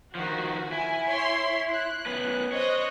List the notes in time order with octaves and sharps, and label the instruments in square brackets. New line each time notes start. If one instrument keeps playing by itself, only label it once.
[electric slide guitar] D#3 F3 [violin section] F#4
[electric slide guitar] E4 [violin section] G#5
[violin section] C#5 C6
F#6
[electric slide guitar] B3 C#4 B4
[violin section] C5 D#5 F#6 [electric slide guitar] C#5